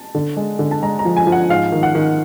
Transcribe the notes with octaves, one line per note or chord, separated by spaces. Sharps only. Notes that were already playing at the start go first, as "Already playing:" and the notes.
Already playing: A5
D3
G#3
D3
A5
G#3 A#5
A#5
F3
G#5
F3
F#5
G#2 F5
D#3
F#5
D#3